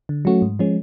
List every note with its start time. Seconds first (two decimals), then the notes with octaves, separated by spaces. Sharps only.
0.09 D3
0.25 F#3 A3 C#4 F#4
0.42 G#2
0.59 F3 G#3 C#4